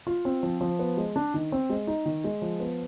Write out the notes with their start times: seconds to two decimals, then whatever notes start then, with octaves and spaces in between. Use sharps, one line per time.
0.07 F4
0.25 C4
0.43 F3
0.61 F3
0.79 B3
0.97 G#3
1.16 D4
1.34 D#3
1.52 C4
1.70 G#3
1.87 D#4
2.06 D#3
2.24 G#3
2.42 F3
2.60 B3